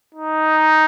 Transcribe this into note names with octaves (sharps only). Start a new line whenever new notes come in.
D#4